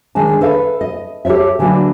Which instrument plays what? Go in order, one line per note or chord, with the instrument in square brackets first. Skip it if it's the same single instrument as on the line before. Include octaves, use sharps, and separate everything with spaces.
[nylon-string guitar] D#3 G#3 D4 A5
A4 B4 E5 F5
D#5
G4 A4 A#4 C#5 E5
D3 E3 F#3 A#3 D4